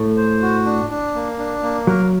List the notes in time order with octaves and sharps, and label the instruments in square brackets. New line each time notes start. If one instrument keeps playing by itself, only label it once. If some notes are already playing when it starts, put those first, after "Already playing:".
Already playing: [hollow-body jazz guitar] A2 A3
[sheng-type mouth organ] C5
F#4
D4
D4
A#3
D4
A#3
[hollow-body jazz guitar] F#3 [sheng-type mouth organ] A#4